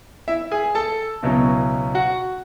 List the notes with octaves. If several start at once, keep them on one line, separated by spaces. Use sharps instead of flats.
E4 E5
G#4 G#5
A4 A5
C#2 B2 F#3 C#4 E4
F#4 F#5